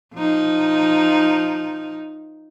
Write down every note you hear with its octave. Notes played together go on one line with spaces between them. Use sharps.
F3 D#4